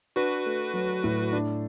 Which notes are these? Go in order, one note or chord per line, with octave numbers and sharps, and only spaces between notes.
D4 F#4 B4
A3
F#3
A2
D4